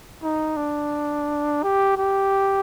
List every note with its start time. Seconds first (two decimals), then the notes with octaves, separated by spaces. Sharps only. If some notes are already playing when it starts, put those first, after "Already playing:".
0.23 D#4
0.57 D4
1.63 G4
1.97 G4